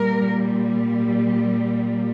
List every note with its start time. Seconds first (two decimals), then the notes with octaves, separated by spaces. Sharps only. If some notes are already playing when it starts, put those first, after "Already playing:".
Already playing: A#2 G3 A#4